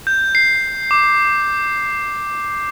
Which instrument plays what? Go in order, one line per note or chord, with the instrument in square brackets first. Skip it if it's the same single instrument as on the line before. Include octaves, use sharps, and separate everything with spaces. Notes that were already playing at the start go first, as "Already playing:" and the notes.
[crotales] G6
C7
D6